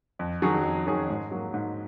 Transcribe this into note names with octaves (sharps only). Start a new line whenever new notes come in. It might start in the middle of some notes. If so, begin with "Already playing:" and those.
F2
D#3 F#3 C#4 G#4
F2
D#3 F#3 C#4 G#4
G#2
F#3 A#3
G#2